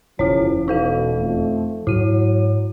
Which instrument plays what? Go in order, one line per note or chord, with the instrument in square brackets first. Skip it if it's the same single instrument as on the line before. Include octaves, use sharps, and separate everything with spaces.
[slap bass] E1 C#4 [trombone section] F#2 C#3 F3 [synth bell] E4 C#5
[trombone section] B2 [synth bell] D#4 A4 F5
[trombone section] F2 A3
[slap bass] G#2 [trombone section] F#3 [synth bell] E4 D#7